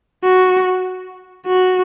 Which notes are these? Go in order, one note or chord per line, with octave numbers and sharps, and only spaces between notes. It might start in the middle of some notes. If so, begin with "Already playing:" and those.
F#4
F#4